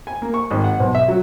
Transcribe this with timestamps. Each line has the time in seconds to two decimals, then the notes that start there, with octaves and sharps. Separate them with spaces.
0.07 G#5
0.22 A#3
0.34 C#6
0.51 G#1
0.64 F#5
0.80 B1
0.95 E5
1.08 F#3